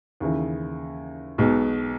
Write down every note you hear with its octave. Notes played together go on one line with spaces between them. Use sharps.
D#2 C#3 E3
B1 B2 G#3